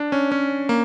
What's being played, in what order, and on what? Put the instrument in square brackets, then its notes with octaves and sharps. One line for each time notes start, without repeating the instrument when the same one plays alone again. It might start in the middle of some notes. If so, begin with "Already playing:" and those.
Already playing: [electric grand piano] D4
C#4
C#4
A#3